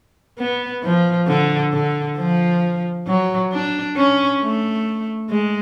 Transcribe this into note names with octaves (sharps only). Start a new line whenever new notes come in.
B3
F3
D3
D3
F3
F#3
D4
C#4
A3
G#3